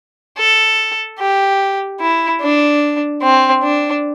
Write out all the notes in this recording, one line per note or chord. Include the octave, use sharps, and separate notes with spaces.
A4
G4
E4
D4
C4
D4